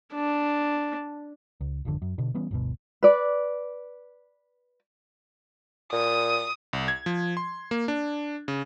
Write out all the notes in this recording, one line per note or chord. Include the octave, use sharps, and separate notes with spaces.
D4
C#2
G#1 F2 D3
F#2
B2 D3
E3 G3 B3 C#4
G1 D2 B2
B4 D5
A#2 D#6
C2
G#6
F3
C6
A#3
D4
C#3